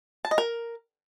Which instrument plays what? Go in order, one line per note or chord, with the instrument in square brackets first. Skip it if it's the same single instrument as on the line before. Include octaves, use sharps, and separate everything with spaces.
[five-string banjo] A5
D#5
A#4